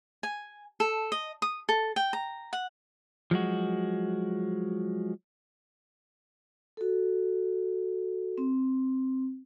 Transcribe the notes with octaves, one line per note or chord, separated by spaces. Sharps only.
G#5
A4
D#5
D#6
A4
G5
A#5
F#5
F3 F#3 G#3 F#4
F#4 A4
C4